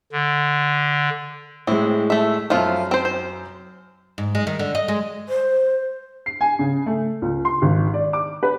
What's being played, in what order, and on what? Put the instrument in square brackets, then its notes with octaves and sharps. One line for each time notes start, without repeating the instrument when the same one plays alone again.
[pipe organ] D3
[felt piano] A2 G#3 [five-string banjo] C4 E4
[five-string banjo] A3 E5
[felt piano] F#2 F6 [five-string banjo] F3 A3 F4
[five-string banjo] C4 C5
C5
[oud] G#2
G#3
D#3
D3
D#5
G#3
[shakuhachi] C5
[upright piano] C7
G#5
C#3
A3
C#2
C6
G#1
D5
D6
B4